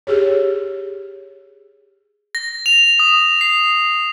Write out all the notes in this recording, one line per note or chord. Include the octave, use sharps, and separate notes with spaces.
G4 G#4 C#5
A#6
F7
D#6
C7